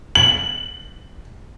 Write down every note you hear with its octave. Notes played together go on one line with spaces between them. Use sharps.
F#7